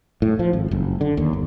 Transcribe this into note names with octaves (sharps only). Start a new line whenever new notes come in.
A2
F3
G#1
F#1
D3
D#2
G1